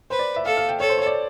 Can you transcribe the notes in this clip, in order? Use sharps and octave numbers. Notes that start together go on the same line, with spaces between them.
B4 C5
D5
E5
A4 F5
F5
G5
A4 C#5
C5
C#5
D5